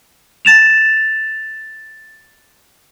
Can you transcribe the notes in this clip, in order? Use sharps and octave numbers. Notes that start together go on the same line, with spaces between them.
A6 E7 F7